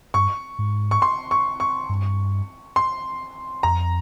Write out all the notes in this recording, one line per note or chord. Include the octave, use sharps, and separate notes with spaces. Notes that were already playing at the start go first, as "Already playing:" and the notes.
G2 C#6
G#2
C#6
C6
C#6
C#6
G2
C6
F2 A#5